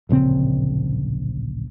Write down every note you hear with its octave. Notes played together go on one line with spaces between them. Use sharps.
D1 A#1 C#3 C4